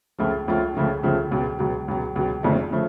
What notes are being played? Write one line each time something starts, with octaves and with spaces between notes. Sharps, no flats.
C#2 C#3 F3 A3 F4
C#2 C#3 F3 A3 F4
C#2 C#3 F3 A3 F4
C#2 C#3 F3 A3 F4
C#2 B2 F#3
C#2 B2 F#3
C#2 B2 F#3
C#2 B2 F#3
F1 F2 C#3 F3 A3
C#3 F3 A3